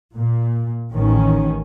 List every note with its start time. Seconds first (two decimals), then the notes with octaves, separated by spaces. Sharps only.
0.16 A#2
0.93 A1 D#3 C#4